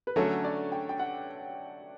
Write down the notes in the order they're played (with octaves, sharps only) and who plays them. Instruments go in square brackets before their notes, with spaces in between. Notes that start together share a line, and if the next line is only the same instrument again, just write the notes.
[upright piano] B4
[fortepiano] D3 F#3 A3 C#4 [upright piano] C#5
[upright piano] D5
G5
G5
F#5